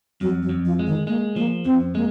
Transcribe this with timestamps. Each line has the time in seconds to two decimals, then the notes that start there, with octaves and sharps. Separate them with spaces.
0.21 F2 F#3
0.42 F#3
0.49 F2
0.65 F3
0.79 G#3
0.87 D#3
1.07 G#3 A#3
1.36 F3 A#3
1.65 F2 C4
1.95 G#3 A#3